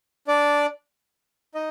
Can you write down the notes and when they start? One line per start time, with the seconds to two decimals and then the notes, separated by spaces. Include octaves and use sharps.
0.27 D4 D5
1.55 D#4 D#5